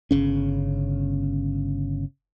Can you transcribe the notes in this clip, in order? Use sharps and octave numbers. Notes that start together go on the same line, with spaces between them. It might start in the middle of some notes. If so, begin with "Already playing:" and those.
G1 C#3 C#4